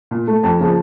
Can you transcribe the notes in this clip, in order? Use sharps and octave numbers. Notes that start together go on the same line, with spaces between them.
A#2
A3
F2 A5
C#3 F3 A#3